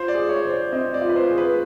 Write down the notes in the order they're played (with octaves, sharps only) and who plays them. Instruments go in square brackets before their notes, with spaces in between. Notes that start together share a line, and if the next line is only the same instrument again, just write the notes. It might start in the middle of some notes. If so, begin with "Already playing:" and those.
Already playing: [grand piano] F4 [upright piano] C5
[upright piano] D5
[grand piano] G#4
[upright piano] C#5
[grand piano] C5
[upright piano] D5
[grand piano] C4 [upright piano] D#5
[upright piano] D5
[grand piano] F4
[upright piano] B4
C5
[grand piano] G#4
[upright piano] B4